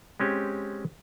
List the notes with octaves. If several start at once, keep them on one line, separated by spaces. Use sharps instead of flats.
G#3 C4 C#4 G4